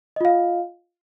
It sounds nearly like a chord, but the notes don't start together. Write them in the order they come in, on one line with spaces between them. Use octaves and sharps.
D#5 F4 F5